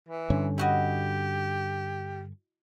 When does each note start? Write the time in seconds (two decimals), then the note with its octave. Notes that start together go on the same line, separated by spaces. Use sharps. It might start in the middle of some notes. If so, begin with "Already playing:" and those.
0.08 E3
0.30 G2 D3 C#4
0.58 E4 F#4 G4 D#5